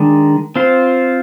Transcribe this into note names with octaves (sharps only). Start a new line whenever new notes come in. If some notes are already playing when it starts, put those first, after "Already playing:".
Already playing: D#3 G#3 D4
C4 F4 C5